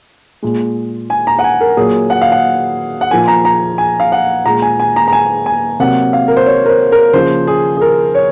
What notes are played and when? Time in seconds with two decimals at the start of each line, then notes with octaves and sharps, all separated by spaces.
0.43 A#2 G#3
1.10 G#5
1.27 A#5
1.39 F#5
1.44 G#5
1.61 A#4
1.77 A#2 F#3 A#3 G#4
2.10 F#5
2.22 F5
2.32 F#5
3.01 F#5
3.11 A#2 F3 A#3 G#5
3.28 A#5
3.45 A#5
3.78 G#5
4.00 F5
4.12 F#5
4.46 A#2 G#3 A#5
4.62 G#5
4.80 G#5
4.96 A#5
5.08 A#5
5.12 G#5
5.46 G#5
5.80 C3 F#3 A#3 F#5
6.13 F5
6.28 A#4
6.37 C5
6.46 C#5
6.66 A#4
6.69 C5
6.92 A#4
7.13 C#3 F3 A#3 C5
7.47 G#4
7.77 G#4
7.81 A#4
8.15 C#5